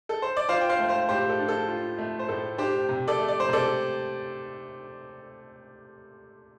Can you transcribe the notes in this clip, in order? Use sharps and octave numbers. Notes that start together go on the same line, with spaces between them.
A4
C5
D5
F4 C5 F5
G5
C5 F5
A3
C5 F5
A2 G4 C5
A4
D4
A4
F4
A3
C5
A2 A4
D4 G4 C5
C3
A4 D5
A3
D5
C5
C3 A4 D5